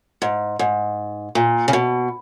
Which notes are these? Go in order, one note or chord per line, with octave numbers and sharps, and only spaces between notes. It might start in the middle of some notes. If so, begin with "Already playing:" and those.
G#2
G#2
A#2
C#3
B2